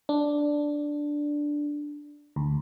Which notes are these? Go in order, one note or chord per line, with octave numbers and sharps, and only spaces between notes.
D4
D2